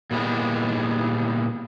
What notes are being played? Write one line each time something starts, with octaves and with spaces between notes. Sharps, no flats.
A#2 G3 G#3 B3 D4 E4